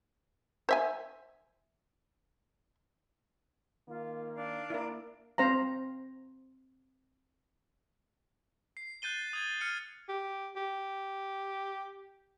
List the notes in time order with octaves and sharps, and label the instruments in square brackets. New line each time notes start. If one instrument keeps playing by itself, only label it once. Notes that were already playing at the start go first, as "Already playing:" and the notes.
[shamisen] C5 E5 G#5
[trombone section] D#3 A#3 [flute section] F4
[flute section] D4 F5
[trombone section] A#3 [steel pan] E4 A#4
[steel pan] C4 C5 F5 A#5
[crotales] C7
F#6 G6 A6 D#7 G7
D#6 G#6 A6
F6 C#7 D#7
[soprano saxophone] G4
G4